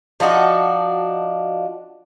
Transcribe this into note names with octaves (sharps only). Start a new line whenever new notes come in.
F3 D4 D#4 F#4